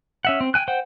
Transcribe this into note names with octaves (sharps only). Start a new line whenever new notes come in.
C#4 E5 F#5
C4
G5 G#5 F#6
C5 F#5 G5